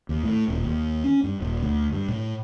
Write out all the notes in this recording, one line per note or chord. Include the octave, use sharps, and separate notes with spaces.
D#2
A2
D#1
D#2
C#4
G2
D#1
D2
G2
A2